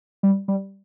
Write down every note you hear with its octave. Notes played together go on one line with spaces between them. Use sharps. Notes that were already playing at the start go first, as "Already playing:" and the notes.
G3
G3